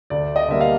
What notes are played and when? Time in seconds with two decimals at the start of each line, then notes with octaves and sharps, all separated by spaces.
0.10 D2 D5
0.36 D#5
0.48 D3 G3 A#3 E5
0.61 F5